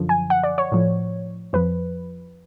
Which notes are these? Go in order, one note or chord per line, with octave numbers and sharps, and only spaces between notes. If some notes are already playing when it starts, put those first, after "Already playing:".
Already playing: F#2 D3 F3
G#5
F#5
D5
C#5
A2 F3
F2 F3 B4